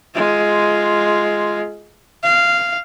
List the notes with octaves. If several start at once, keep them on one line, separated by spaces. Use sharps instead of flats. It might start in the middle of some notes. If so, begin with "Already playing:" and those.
G#3 F4
F5